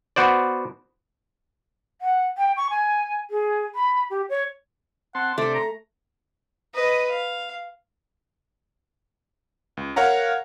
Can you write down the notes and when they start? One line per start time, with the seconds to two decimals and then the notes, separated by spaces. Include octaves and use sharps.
0.16 B3 F#4 C5 D5
2.01 F#5
2.38 G5
2.57 C#6
2.70 G#5
3.30 G#4
3.75 B5
4.10 G4
4.29 C#5
5.15 C4 F#5 A5 C6
5.38 C3 A3 D4 C5 D5
5.55 A#5
6.74 B4 D#5
7.10 F5
9.77 C#2
9.96 A#4 C#5 F5 F#5 A#5